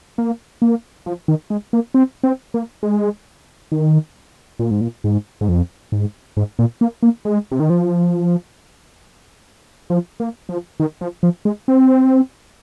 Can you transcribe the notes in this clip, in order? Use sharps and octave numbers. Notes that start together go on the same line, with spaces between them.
A#3
A#3
F3
D#3
G#3
A#3
C4
C4
A#3
G#3
D#3
A#2
G#2
A#2
G#2
G#2
F2
G#2
G#2
A#2
A#3
A#3
G#3
C3
D#3
F3
F3
A#3
F3
D#3
F3
F3
G#3
C4